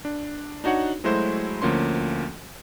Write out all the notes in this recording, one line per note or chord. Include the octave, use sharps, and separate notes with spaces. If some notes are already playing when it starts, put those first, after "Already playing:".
D4
D4 D#4 F#4 C#5 F#5
F#3 G#3 A3 E4 F#4 C5
D2 F3 A#3 C#4 C6